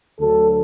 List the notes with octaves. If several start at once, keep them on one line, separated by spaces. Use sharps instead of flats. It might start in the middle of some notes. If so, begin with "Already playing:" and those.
D2 D3 F#3 A4